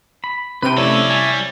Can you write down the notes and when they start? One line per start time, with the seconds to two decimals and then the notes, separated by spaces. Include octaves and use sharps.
0.24 B5
0.63 C3 B4 G5 D#7
0.77 F2 A3 C#4 E4 A4 C#5 D5
1.10 G3 G#5